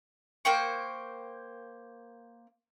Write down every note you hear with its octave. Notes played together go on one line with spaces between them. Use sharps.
A#3 C5 G5 C#6